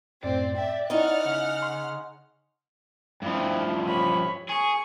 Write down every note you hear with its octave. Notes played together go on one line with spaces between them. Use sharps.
F#2 A2 C4 D5
E5 G5
C#4 D#4 E4 C#5 F#5 F6
C#3
C6
G2 F3 E4
C#5 B5
G#4 C#6